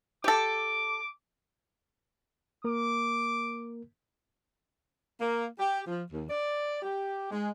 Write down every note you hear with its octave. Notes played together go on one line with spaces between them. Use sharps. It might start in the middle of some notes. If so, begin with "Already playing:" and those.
G4 A4 D6
A#3 A#4 D6
A#3
G4
F3
D#2
D5
G4
G#3